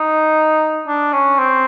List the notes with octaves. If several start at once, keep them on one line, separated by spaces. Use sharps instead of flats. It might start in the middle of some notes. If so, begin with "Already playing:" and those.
Already playing: D#4
D4
C#4
C4